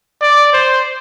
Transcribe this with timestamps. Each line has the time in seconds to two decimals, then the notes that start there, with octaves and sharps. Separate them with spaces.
0.21 D5
0.53 C5